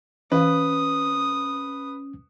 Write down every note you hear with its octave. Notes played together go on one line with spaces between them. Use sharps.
E3 C#4 B4 F5 D#6